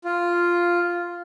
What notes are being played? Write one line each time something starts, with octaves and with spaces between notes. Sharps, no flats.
F4